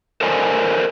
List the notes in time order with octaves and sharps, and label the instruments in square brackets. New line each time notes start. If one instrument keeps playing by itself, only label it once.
[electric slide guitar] A4 A#4 C5 D5 D#5 G#5